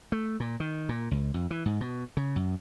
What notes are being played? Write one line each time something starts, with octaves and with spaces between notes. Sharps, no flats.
A3
A#2
D#3
A#2
C#2
F2
E3
G#2
B2
C#3
F#2